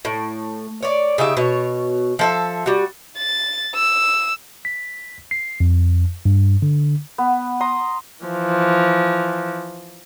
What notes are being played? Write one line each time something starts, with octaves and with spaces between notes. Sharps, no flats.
A2
C#5 D5
C#3 D#4 G4 E5
B2 C#5
F3 A4 E5
G3 F#4
A6
E6
B6
C7
F2
G2
D3
B3
A#5 C6 D#6
E3 F3